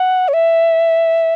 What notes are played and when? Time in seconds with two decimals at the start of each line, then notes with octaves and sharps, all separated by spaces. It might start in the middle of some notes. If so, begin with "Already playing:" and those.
Already playing: F#5
0.28 C#5
0.34 E5